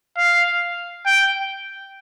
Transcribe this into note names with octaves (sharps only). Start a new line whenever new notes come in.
F5
G5